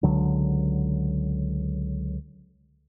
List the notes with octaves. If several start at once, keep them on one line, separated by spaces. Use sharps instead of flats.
C#2 D3 F#3